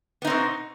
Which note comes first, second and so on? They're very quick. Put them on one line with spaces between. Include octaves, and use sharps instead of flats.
B3 D#4 C4 B2